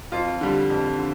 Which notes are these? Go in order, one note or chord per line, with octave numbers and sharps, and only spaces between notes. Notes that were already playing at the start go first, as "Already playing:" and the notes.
F2 F4
D3 G3
F2
D3